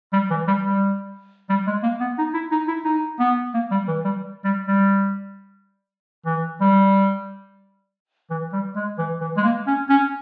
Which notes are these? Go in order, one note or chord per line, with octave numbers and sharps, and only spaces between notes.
G3
E3
G3
G3
G3
G#3
A#3
B3
D#4
E4
D#4
E4
D#4
B3
A#3
G3
E3
G3
G3
G3
E3
G3
E3
G3
G#3
E3
E3
G#3
A#3
C#4
C#4